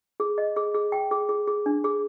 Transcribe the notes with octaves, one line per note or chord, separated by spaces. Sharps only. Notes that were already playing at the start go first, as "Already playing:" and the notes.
G#4
D#5
G#4
G#4
G5
G#4
G#4
G#4
D4
G#4